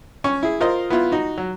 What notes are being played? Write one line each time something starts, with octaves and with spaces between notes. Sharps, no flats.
C#4 C#6
E4 G#4
F4 A#4 C5 D#5
B3 E4 F4
D#4 F#4
F#3